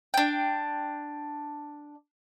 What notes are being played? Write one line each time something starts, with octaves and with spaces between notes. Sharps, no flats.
D4 G5